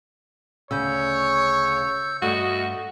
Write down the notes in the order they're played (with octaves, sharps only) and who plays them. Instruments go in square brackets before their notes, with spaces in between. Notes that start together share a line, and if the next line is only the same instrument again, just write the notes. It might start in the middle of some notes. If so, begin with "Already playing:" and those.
[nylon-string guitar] D2 C#3 [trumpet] C#5 [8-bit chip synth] E6 G6
[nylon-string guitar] G2 A3 [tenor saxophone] F#4 [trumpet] D#5